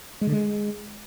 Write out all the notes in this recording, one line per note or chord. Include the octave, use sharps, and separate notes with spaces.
G#3
D3
G#3